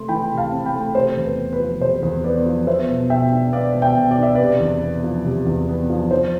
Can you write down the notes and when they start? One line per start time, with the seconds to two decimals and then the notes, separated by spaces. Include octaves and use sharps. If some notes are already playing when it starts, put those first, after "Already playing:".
Already playing: C3 A3 C6
0.08 E3 G5 B5
0.31 C3
0.38 F5 A5
0.52 C4
0.66 G5 B5
0.74 A3
0.95 C3 C5
1.17 E2
1.24 B4
1.38 B3
1.53 B4
1.60 F3
1.80 C3 C5
2.03 E2
2.24 B3 B4 D5
2.46 F3
2.67 B3 C5 E5
2.89 B2
3.10 B2 E5 G5
3.31 D4
3.53 B3 D5 F5
3.75 B2
3.82 E5 G5
3.96 B2
4.11 D5
4.17 D4
4.23 E5
4.35 C3 B4 D5
4.60 E2
4.82 B3
5.04 F3
5.25 C3
5.46 E2
5.68 B3
5.90 F3
6.11 F3 C5